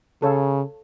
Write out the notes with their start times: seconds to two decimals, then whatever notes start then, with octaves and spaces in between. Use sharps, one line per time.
0.22 C#3 A4 C#5 F5